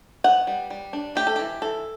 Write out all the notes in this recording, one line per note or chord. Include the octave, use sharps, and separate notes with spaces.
B3 F#5
G3
G3
D4
A3 G4
A4
E3 G4
E3 A4